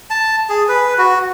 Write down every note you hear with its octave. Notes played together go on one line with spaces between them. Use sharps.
A5
G#4
B4
F#4